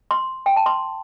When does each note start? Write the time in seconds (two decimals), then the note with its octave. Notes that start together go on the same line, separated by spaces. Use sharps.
0.11 C6
0.46 G5
0.56 A5
0.66 C6